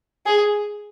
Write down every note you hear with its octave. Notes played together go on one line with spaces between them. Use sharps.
G#4